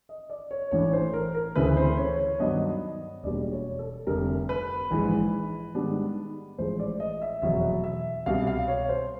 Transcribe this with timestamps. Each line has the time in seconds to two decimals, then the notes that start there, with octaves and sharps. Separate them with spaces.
0.09 D#5
0.30 D5
0.51 C#5
0.71 A1 A2 E3 A3 D4 C#5
0.93 C5
1.14 A#4
1.35 A#4
1.56 D2 C#3 E3 A3 C4 B4
1.77 C5
1.97 C#5
2.19 C#5
2.39 G2 D#3 F#3 B3 D4 D#5
3.23 E1 E2 B2 G3 A#3 D5
3.52 C#5
3.79 A4
4.07 F1 F2 D3 G3 A#4
4.49 B4
4.91 A#1 G#2 E3
5.75 G#2 D#3 G3 B3 D4
6.58 A1 A2 F3 G#3 C5
6.79 D5
7.00 D#5
7.22 E5
7.42 F1 E2 B2 F#3 E5
7.84 E5
8.26 C2 B2 G3 F5
8.47 F5
8.68 C#5
8.89 C5